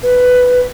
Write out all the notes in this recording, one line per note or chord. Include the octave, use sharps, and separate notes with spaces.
B4